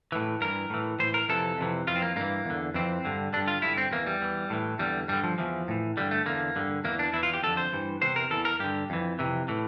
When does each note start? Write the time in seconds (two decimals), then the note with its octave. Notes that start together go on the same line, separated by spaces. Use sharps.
0.12 A2 E3
0.41 G2 E3 A#4
0.70 A2 E3
0.99 A2 E3 C5
1.14 A#4
1.29 F2 C3 E3 A4
1.57 F2 C3 E3
1.87 F2 E3 F4
1.96 C4
2.02 A#3
2.16 G2 E3 A#3
2.45 E2 D3
2.74 F2 E3 C4
3.05 G2 D3
3.33 G2 D3 D4
3.48 F4
3.62 G2 D3 E4
3.78 C4
3.92 E2 E3 A#3
4.06 G3
4.22 E2 E3
4.50 A2 E3
4.79 E2 D3 G3
5.08 G2 D3 G3
5.24 F3
5.38 E2 E3 F3
5.68 A2 E3
5.97 G2 D3 G3
6.11 A3
6.26 E2 D3 A#3
6.55 G2 D3
6.84 E2 E3 A#3
6.99 D4
7.13 E2 E3 E4
7.23 F4
7.34 G4
7.43 F2 D3 A4
7.57 C5
7.73 G2 E3
8.01 E2 C3 E3 C5
8.16 A#4
8.31 E2 E3 A4
8.45 A#4
8.59 G2 D3 G4
8.90 F2 E3
9.19 F2 C3 E3
9.48 A2 E3